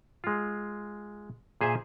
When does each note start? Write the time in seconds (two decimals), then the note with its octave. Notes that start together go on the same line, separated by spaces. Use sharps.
0.24 G#3 F4
1.61 A#2 G#4 C5 E5 G#5